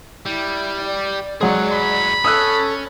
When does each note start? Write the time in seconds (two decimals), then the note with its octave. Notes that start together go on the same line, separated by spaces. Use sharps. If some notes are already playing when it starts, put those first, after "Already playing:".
0.26 G3 E4
0.84 D5
1.41 F#3 G#3 G#4 F#5
1.72 B5
2.25 C#4 A4 D#6 E6 F#6